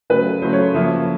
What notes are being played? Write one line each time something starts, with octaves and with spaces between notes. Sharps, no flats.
C#3 F#3 A3 B4
C#3 F#3 A3 C5
C#5
C#3 F3 A#3 E5